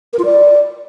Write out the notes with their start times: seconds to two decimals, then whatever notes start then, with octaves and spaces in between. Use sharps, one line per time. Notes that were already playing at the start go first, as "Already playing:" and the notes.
0.13 A#4
0.19 F4
0.25 D5